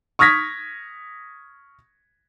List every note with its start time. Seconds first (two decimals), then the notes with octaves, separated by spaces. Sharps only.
0.19 C#6 D#6 F6 G#6 A#6 B6